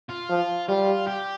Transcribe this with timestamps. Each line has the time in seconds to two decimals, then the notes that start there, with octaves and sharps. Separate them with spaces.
0.10 F4
0.29 F3
0.69 G3 F4
1.08 G4